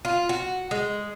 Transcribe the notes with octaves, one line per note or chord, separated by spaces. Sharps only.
F4
F#4
G#3